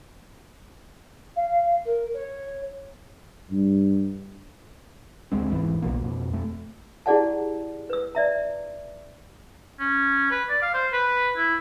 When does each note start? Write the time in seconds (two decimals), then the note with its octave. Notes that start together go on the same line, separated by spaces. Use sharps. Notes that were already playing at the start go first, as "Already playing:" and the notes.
1.36 F5
1.85 A#4
2.14 C#5
3.51 G2
5.32 D2 G#3 C4
5.52 E1 G#2 E3
5.82 B1 B2 F3 A#3
6.01 F2 B2
6.31 F2 A3
7.06 E4 G4 G#4 D5 F#5 A5
7.90 B4 E6
8.15 D5 E5 A#5
9.80 C#4
10.31 B4
10.49 D5
10.62 F5
10.74 C5
10.93 B4
11.37 E4